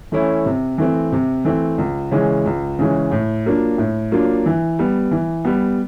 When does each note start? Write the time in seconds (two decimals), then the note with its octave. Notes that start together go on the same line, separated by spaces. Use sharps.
0.12 E3 A3 C#4 E4
0.46 C3
0.78 E3 A3 C4
1.12 C3
1.45 E3 A3 C4
1.78 C#2
2.11 C#3 E3 G#3 C#4
2.46 C#2
2.79 C#3 E3 G#3 C#4
3.11 A2
3.45 F#3 A#3 D4 F4
3.78 A2
4.11 F#3 A#3 D4 F4
4.46 E3
4.79 G3 B3
5.11 E3
5.45 G3 B3